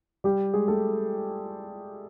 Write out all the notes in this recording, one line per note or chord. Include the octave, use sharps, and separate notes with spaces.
G3 G4
G#3 G#4
A3 A4